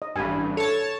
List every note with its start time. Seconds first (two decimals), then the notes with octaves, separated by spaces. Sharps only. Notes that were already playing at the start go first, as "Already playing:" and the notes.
0.02 D#5
0.16 A1 G2 G#5 B5
0.57 A4 C#5 A5